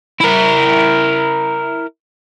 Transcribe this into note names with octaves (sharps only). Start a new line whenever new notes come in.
E4 A#4